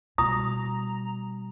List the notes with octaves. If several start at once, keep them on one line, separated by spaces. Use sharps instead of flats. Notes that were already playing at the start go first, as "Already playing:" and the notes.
B2 G3 A#5 D#6